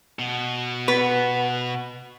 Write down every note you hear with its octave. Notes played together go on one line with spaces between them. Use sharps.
B2
B3 B4